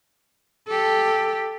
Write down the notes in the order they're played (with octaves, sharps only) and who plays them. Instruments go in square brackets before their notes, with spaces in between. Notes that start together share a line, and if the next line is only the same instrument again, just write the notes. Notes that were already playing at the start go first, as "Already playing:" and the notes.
[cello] G4 A4